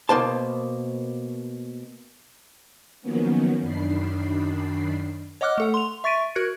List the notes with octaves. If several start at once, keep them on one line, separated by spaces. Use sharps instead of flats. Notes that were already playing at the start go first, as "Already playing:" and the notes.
B2 A#3 C5 A5
D#3 F3 F#3 A#3 B3 C#4
F#2 D#3 D4 B5 C7
C#5 D#5 F#5 D6 F6 F#6
A3 A4 F#5
C6 F7
E5 C#6 A6 B6 D7 D#7
F#4 A#4 F#6 G#6 C#7